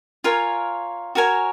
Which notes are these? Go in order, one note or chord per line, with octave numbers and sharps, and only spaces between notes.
F4 A#4 C#5 G#5
F#4 A#4 C#5 G#5